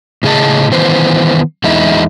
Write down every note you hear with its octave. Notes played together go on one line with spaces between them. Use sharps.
A2 C#3 G#4 D#5 A5
D#3 E3 B3 C5
E2 G#3 D#4 E4